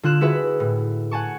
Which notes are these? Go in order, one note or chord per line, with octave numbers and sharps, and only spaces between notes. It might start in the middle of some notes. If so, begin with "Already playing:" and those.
D3 F4 F#6 E7
E4 F#4 G#4 B4 E5
A2
F#5 G#5 A5 C#6